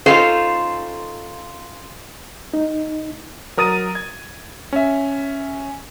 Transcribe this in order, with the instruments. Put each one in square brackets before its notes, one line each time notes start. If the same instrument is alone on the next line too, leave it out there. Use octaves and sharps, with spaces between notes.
[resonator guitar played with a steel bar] C#4 D#4 F4 A4 C5
[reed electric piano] D#4
[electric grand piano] F#3 A#4 D#6 A6 D#7
G#6
C#4 E5